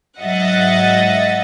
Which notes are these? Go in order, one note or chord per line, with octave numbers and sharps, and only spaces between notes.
G#2 F#3 D#5 E5 F#5 A6